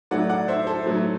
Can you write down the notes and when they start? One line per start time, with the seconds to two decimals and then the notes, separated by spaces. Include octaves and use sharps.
0.11 A2 F#3 A3 D5 F#5
0.29 D5 F#5
0.48 C5 E5
0.67 A4 C5
0.86 A2 F#3 A3